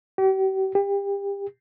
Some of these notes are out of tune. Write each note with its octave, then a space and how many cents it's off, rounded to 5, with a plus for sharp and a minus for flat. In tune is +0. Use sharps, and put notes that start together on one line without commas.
G4 -40
G4 +30